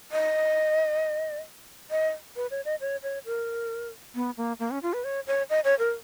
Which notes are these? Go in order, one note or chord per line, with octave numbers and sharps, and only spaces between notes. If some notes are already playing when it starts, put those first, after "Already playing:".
D#5
D#5
B4
C#5
D#5
C#5
C#5
A#4
B3
A#3
A#3
C#4
F4
B4
C#5
C#5
D#5
C#5
A#4